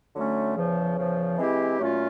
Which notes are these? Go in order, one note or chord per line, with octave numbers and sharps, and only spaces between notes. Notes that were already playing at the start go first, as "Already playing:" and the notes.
D3 F#3 A3 C#4
E2 C#3 F3
E2 C#3 F3
E3 G#3 C4 E4 G4
A#2 F#3 A3 C#4 F4